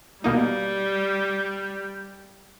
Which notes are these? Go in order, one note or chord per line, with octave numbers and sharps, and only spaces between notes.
B2 G3 A#3 D#4